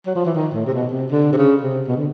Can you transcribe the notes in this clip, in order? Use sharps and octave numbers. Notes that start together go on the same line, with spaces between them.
F#3
F3
E3
D#3
A2
C3
B2
C3
D3
C3
C#3
C3
B2
D3